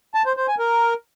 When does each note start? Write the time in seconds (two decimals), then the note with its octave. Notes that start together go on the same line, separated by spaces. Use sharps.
0.14 A5
0.26 C5
0.37 C5
0.48 G#5
0.59 A#4